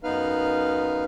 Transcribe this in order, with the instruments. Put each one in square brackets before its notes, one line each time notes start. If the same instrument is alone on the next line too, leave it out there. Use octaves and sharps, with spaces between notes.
[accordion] F#2 B3 D#4 B4 F5 F6